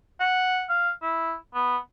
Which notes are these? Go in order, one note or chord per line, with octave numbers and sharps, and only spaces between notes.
F#5
F5
E4
B3